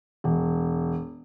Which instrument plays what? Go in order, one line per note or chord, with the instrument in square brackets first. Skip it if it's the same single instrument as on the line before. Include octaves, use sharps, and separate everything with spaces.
[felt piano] E1